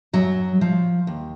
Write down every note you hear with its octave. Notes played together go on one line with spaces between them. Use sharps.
F#2 F#3
F3
D#2